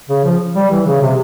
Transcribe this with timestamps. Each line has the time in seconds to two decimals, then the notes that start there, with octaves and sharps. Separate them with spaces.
0.09 C#3
0.25 F3
0.56 G3
0.71 E3
0.86 C#3
1.02 C3